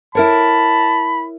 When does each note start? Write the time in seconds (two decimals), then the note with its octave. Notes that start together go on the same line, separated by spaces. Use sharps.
0.15 E4 A#4 C#5 A5 B5